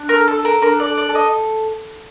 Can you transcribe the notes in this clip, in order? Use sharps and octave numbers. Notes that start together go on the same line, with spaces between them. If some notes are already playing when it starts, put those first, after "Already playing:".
Already playing: D4
A#4
A4
A4
A4
A#4
D4 A#4
D5
A4
D5
A4
D#5